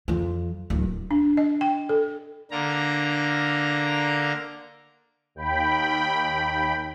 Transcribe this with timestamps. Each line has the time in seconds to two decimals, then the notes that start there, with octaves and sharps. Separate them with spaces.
0.08 F2 F3
0.70 D1
1.11 D4
1.37 D#5
1.61 G5
1.89 A4
2.51 D3 A#3 A#5
5.35 D#2 G5 B5